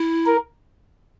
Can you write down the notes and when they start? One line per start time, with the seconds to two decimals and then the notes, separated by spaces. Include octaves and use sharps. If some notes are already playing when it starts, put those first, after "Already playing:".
Already playing: E4
0.26 A#4